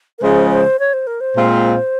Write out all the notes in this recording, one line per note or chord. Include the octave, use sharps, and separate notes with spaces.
A#4
C#3 F3 G#3 C5
C5
C#5
C5
A#4
C5
A#2 G#3 C4 F4